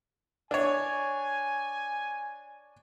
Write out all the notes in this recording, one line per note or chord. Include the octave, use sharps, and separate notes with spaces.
D4 C#5 G#5